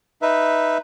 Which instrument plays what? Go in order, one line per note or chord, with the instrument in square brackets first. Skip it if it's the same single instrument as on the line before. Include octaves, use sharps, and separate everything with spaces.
[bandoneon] D#4 B4 E5